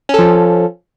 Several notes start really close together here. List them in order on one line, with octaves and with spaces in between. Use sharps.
C#4 A4 F3